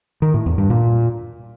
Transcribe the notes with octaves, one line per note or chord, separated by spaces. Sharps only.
D#3
A2
E2
G2
A#2